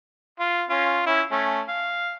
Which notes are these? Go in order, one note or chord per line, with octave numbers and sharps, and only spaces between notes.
F4
C#4 F4
C#4 E4
A3 C#4
F5